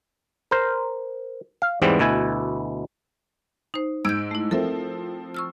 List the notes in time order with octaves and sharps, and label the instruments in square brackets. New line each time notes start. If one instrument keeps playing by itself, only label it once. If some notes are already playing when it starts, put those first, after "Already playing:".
[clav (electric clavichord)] A#4 C5
F5
E2 G#2 E3 G3 B3 C4
D2 B2 E4 G#5
[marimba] D#4 C5
[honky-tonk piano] G#2 E6 D7 [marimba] G6 G#6
[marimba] A3 E4
[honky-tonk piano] F3 C4 [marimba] A4 A#4 E5
[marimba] C#6 E6 F6